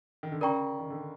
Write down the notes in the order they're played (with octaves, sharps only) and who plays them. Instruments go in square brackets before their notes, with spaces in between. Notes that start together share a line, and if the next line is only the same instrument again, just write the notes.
[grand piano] D#3
D3
[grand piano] C#3 [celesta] A#4 D5 G5 A#5 C#6
[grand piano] D#3
D3